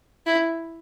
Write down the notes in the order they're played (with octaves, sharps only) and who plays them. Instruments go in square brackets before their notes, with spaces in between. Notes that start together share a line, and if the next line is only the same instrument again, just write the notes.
[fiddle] E4